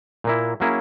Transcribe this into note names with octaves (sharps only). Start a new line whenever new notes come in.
A#2 A#3 E4
F#3 A#3 C#4 E4 G#4